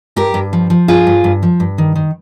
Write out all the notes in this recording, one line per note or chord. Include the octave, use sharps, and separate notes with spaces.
G2 G4 A#4
G2
F3
F3
G2 F4 G#4
G2
G2
F3
G2
D#3
D#3